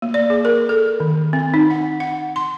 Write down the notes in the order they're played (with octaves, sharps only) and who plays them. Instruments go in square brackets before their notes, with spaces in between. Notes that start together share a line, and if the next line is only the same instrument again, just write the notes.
[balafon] A#3
D5
G#4
A#4
A4
D#3
C4
D#4
F#5
F#5
C6